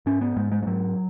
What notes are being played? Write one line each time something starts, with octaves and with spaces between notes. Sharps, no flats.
G#2 C#4
B3
G#2 G#3
G#3
G#3
G#2 F#3